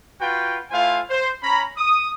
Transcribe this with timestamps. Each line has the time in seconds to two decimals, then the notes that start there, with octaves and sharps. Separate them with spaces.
0.20 F4 F#4 B4 G5
0.71 A3 E4 F4 C5 F5 G#5
1.10 C5
1.42 C#4 A#5 B5
1.77 D#6